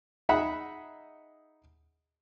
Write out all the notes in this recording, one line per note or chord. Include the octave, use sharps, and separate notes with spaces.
D#4 G#4 E5 F#5 B5